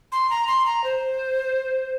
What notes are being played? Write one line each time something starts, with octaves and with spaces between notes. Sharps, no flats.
C6
A#5
C6
A#5
C5